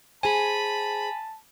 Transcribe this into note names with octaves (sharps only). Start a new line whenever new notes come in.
G#4 C5 G#5 A5 B5